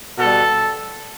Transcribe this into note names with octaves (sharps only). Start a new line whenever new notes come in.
B2 G3 A4